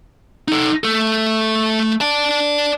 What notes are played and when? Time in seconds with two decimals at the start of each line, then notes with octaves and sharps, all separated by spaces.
0.48 D#4 A4
0.84 A3 A4
2.01 D5 A5